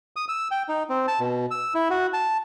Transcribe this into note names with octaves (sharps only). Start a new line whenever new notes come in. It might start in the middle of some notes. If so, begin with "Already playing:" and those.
D#6
E6
G5
D#4
C4
A5
B2
E6
E4
F#4
A5